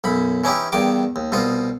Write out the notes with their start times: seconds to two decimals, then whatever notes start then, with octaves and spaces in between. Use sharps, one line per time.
0.04 B1 F#2 B5
0.44 E3 C#4 D#4 E4 G4
0.72 E2 G2 D#3 G5 D6
1.16 D#2
1.32 C2 B2 F4 D#5